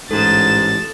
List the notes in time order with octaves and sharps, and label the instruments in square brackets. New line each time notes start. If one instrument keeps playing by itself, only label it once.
[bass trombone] A1 [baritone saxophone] G#2 [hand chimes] A4 [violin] A6 E7